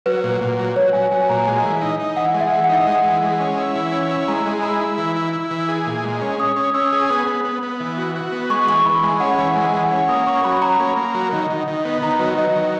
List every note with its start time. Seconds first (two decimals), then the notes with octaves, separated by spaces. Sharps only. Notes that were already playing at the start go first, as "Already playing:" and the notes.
0.06 F#3 B4
0.23 A#2
0.41 A#2
0.59 F#3
0.76 F#3 C#5
0.93 F#3 G#5
1.11 F#3 G#5
1.29 A#2 A#5
1.47 G#3 G#5
1.64 E3
1.81 D#4
2.00 D#4
2.17 E3 F#5
2.34 G#3
2.41 E5
2.52 E3
2.64 F#5
2.69 D#4
2.87 G#3
3.05 E3
3.22 G#3
3.40 C#4
3.58 E4
3.75 E3
3.92 C#4
4.11 E4
4.28 G#3 A#5
4.46 G#3
4.63 E4 B5
4.81 E4
4.98 E3
5.16 E4
5.33 E4
5.51 E3
5.69 G#4
5.86 A#2
6.04 G#3
6.21 C#4
6.39 C#4 D#6
6.56 C#4 D#6
6.74 C#4 E6
6.92 G#4 D#6
7.09 B3 D#6
7.27 B3
7.45 B3
7.63 B3
7.80 E3
7.97 F#4
8.15 F#4
8.32 B3
8.50 G#3 C#6
8.67 E3 C#6
8.85 E3 B5
9.03 G#3 G#5
9.20 C#4 F#5
9.38 E3
9.55 G#3 G#5
9.73 E3 F#5
9.83 G#5
9.91 C#4 F#5
10.09 A#3 D#6
10.26 C#4 C#6
10.44 F#3 B5
10.61 C#4 A#5
10.80 A#3
10.96 A#3
11.14 F#3
11.32 D#3
11.50 D#3
11.67 D#3
11.85 B3
12.02 D#3 A#5
12.19 F#3 B4
12.38 F#3 D#5
12.56 D#3 D#5